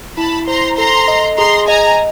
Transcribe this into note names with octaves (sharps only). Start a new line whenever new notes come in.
E4 A5 B5
C5 A#5 C6
A4 A#5 C6
D#5
G#4 A#5 C6
D#5 G#5 A#5